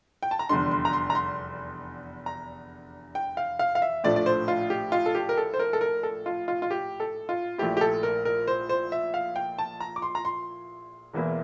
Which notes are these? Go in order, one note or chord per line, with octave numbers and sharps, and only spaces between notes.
G5
A5
A#5
F1 E2 D3 G3 D4 C6
C6
A#5
C6
A#5
C6
A#5
G5
F5
F5
F5
E5
A#1 A2 F3 A3 D4 D5
D5
C5
F4
G4
F4
A4
G4
A#4
A4
C5
A#4
A4
A#4
A4
F4
F4
F4
G4
A4
F4
A#1 A#2 A3 E4 G4
G4
A4
A#4
A#4
C5
C5
E5
F5
G5
A5
A#5
D6
C6
A#5
C6
E1 E2 E3 A#3 E4